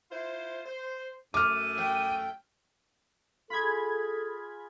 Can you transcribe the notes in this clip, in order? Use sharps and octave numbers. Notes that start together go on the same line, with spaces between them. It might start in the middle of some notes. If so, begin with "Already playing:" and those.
E4 F4 C5
C5
F#2 A3 D6 F6 D#7
G5
F4 G#4 A4 B5 G#6